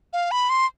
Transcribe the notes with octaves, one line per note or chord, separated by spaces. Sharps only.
F5
B5
C6